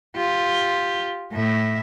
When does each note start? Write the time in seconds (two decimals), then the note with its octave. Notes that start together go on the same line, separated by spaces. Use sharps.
0.17 F4 G4
1.32 A2 E5